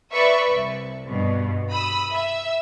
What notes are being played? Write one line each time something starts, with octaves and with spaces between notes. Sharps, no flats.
B4 D5 E5 C#6
C2
G2 B2
B5 D#6 E6
E5 E6